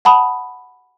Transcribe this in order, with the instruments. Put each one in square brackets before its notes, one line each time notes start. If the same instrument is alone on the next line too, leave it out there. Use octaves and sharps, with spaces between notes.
[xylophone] F#5 A5 B5 D#6